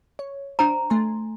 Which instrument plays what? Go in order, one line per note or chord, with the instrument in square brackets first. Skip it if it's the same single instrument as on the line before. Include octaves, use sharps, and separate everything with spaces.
[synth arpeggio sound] C#5
[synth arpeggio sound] D4 C5 [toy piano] A#5
[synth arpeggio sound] A3 G#5 C6